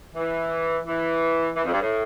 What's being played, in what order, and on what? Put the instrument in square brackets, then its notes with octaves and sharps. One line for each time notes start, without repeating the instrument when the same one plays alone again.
[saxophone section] E3
E3
E3
F2
G2
A2